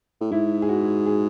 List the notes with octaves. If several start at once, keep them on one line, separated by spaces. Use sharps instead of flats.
A2
G#2 E4
G#4
F#4
G#4